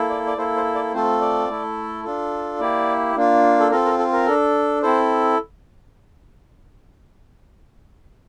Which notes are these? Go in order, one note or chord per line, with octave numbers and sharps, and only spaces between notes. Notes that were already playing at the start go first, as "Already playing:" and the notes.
Already playing: A#3 E4 A4
D5
D5
A#3 E4 A4 C5
C5
D5
A3 C4 F4 A4 C5
D5
A3 E4 A4
D4 F4 A4
A#3 E4 G4 D5
A#3 D4 F4
A4
C4 F4 A4 A#4
A#4
A4
A#4
D4 A4
C4 E4 A4 C5